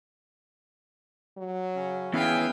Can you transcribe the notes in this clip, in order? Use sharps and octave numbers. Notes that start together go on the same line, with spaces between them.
F#3
C#3 C#4
E3 B3 C#4 G#4 B4 E5 F5 G5